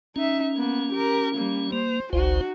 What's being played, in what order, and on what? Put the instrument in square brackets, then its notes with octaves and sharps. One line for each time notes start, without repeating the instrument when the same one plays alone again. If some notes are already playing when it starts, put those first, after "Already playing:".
[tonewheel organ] C#4 [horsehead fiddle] D#4 E5
[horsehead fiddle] A#3 B3
G4 A#4
G3 A#3
[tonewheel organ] A#3 [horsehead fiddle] C5
[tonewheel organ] G1 C#2 C5 [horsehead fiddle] D#4 F#4